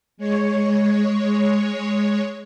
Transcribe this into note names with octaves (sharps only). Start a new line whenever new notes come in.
G#3 C#5